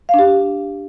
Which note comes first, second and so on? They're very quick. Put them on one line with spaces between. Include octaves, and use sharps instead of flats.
F5 D4 G4